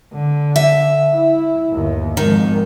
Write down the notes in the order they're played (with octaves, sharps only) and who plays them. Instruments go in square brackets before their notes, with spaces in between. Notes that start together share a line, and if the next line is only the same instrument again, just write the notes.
[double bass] D3
[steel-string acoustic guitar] E5
[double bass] E4
G1 D#2
[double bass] G#1 F2 [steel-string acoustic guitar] D#3